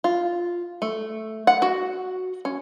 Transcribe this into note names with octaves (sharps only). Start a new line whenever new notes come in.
F4
A3
F#5
F#4
C#4